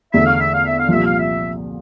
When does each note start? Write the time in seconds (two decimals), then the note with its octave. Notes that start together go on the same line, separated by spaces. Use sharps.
0.13 E2 D3 A3 E5
0.26 F5
0.40 E5
0.54 F5
0.66 E5
0.79 F5
0.89 C2 A#2 F3 E5
1.06 F5
1.19 E5